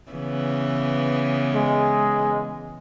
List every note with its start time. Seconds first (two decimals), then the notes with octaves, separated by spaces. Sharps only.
0.12 C#3 E3 B3
1.54 G#3